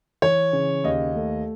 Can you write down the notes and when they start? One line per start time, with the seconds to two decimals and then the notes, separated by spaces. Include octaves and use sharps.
0.22 E3 C#5
0.53 C#3
0.84 D#2 D#5
1.15 A3